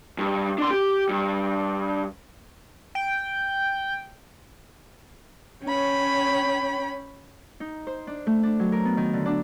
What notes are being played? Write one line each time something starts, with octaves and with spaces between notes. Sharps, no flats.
G2
D4 C6
G4
G2
G5
C#4 C#5 G5 B5
D#4
C5
D4
A3
D4
F#3
A#4
B3
D#3
D3
D4